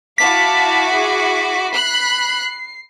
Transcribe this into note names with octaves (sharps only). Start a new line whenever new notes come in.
E4 F#4 F5 A5 D6 B6
G#4 F#5
B5 F#6 C7